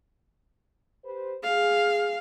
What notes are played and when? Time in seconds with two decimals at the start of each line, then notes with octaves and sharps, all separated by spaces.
1.04 G4 B4 C5
1.43 G#4 F5